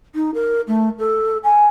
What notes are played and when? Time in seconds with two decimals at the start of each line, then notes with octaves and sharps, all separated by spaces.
0.15 D#4
0.34 A#4
0.67 A3
0.99 A4
1.44 G#5